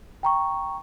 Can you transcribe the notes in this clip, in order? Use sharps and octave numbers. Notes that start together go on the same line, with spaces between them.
G5 A#5 C#6